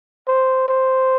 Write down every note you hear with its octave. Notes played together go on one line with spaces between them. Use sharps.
C5
C5